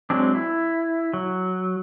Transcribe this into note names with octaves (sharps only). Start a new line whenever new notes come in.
F#3 G#3 C4 D4
E4
F#3